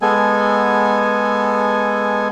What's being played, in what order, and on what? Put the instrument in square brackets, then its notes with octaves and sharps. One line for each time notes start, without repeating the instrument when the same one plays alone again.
[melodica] G#3 B3 A4 G#5